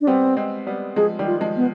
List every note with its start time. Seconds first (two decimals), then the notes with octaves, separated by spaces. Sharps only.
0.01 D4
0.07 G3 B3 C4
0.37 G#3 C4
0.67 G3 B3
0.96 F3 G#3 G#4
1.19 D#3 G3
1.26 F4
1.41 F3 G#3
1.56 B3